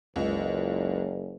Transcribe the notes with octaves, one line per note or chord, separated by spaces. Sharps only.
F#1 C#2